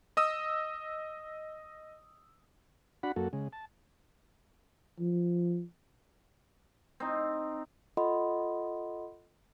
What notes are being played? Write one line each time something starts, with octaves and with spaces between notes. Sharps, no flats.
D#5 D#6 E6
D4 F#4 F#5 B5
F#2 A#3 F#4 A4
C#3 G#3
A5
F3
C4 D#4
F4 A4 D#5 F#5 B5 C6